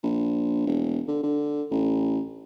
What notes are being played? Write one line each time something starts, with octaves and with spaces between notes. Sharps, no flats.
A#1
E1
D3
D3
A1